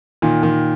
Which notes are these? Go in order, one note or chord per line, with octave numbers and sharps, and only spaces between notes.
A#2 D#3
A#2 D#3